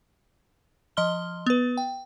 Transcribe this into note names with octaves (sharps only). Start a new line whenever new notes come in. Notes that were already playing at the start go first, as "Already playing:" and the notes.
F3 D#5 C6 F6 G7
B3 B4
G5